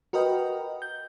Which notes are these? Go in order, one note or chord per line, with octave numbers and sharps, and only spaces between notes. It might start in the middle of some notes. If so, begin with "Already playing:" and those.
F#4 A#4 B4 D#5 G5
G6